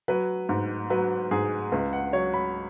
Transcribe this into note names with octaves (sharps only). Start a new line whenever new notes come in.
F#3 B4
G#2
F#3 B4
G#2 G#4
C#2 B4
F#5
F#3 C#5
B5